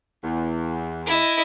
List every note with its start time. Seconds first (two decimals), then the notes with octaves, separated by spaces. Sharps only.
0.24 E2
1.06 E4 D#5